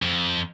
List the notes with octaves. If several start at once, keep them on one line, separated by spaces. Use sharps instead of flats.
F2